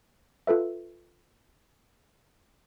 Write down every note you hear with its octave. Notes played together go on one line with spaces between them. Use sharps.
F4 A4 B4 E5